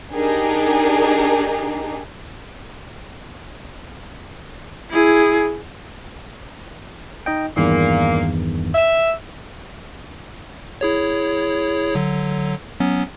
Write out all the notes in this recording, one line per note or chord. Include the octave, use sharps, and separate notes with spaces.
D4 D#4 G4 G#4 A#4
E4 G#4
D#4 D#5 G5
E2 G2 A#2 D#3 A#3
E5
E4 G#4 C#5
D3 F#3
F#3 B3 C#4